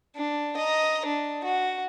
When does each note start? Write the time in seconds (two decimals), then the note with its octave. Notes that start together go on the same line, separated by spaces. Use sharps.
0.15 D4
0.56 D#5 A#5
1.06 D4
1.44 F#4